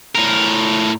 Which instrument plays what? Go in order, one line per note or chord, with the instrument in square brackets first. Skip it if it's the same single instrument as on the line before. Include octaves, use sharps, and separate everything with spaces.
[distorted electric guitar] A2 A#4